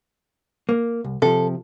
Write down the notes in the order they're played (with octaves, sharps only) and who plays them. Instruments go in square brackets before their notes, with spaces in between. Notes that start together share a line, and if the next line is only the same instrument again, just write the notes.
[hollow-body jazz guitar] A#3
C2
[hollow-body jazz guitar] C3 F3 [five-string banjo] A4